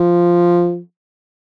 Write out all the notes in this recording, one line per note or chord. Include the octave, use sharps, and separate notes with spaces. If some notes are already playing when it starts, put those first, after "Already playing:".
Already playing: F3